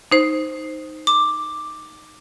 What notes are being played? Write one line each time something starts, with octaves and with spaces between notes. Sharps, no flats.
D#4 C5
D6